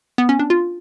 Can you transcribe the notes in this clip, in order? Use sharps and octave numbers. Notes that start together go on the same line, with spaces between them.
B3
C#4
D4
F4